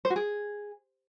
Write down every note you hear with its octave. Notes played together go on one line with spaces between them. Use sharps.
C5
F#4
G#4